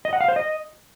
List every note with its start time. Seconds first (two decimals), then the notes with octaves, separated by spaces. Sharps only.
0.05 D#5
0.13 F#5
0.21 F5
0.28 C5
0.36 D#5